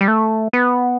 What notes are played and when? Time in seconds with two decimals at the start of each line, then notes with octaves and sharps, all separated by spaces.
0.01 G3
0.08 A3
0.53 B3